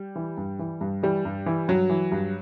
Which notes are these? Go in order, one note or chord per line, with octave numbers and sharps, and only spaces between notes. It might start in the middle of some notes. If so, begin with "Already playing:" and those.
Already playing: G3
E3
G2
E3
G2
E3 G3
G2
E3
G2 F#3
E3
G2